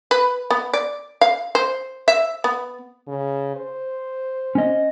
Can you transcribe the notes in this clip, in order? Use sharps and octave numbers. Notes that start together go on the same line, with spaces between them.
B4
B3
D5
F5
C5
E5
B3
C#3
C5
C#4 D#5